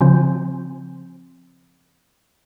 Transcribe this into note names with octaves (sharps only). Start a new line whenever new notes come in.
C#3 F3 C4